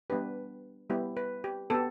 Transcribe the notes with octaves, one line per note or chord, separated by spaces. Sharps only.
G3 B3 D4 G4 B4
G3 B3 E4 G4
B4
G4
B3 G4 A4